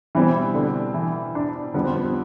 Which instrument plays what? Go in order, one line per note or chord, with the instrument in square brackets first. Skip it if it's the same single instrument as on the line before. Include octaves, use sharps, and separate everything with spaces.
[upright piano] B2 G3 C4 E4 [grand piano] E3
[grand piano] D3
E3
D4
[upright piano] F2 D3 G3 [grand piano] B3
[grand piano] C4
B3